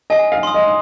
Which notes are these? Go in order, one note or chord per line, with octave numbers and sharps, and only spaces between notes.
D#5 G#5
F5
C6 D#6
D#5